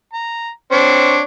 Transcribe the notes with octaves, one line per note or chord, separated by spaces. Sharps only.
A#5
C4 D4 C#5